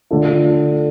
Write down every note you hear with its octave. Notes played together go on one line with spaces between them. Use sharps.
D3 A3 D4 F4 A4